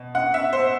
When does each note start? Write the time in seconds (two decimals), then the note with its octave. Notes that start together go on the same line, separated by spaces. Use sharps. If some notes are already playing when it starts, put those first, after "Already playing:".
Already playing: B2
0.15 F#5
0.34 E5
0.53 C5